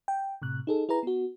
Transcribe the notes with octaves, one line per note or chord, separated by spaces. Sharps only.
G5
A2 C3 F#6
D#4 G#4 A4
E4 G#4 B4 A#5
B3 F#4